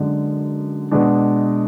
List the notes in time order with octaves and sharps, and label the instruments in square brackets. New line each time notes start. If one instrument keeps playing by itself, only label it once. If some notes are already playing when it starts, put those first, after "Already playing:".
Already playing: [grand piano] F#2 D3 G#3
B2 G#3 D4